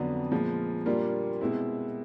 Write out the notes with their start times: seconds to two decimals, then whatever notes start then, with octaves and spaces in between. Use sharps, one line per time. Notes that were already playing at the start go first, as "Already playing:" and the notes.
Already playing: F2 D3 F#3 B3 D4
0.32 A#2 F3 G#3 B3
0.86 A#2 G3 A#3 D4 F4
1.41 B2 G#3 C4 E4